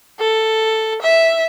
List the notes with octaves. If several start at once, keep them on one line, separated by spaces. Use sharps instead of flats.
A4
E5